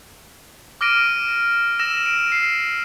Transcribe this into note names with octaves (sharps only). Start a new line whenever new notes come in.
D6 F6 A#6 D7 D#7
E6 A#6 E7
D7
C7